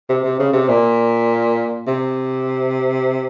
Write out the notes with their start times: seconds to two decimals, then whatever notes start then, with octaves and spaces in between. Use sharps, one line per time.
0.09 C3
0.24 C3
0.39 C#3
0.53 C3
0.69 A#2
1.87 C3